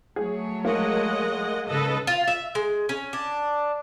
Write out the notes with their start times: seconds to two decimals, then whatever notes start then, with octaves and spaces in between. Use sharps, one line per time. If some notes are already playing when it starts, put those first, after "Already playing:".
0.16 F#3 A3 G#4 C#5
0.65 G#3 A#3 D#5 F#5
1.67 G#2 C#3 A4 B4 D#5
2.07 F4
2.27 E5
2.55 G#3
2.89 C#4
3.13 D4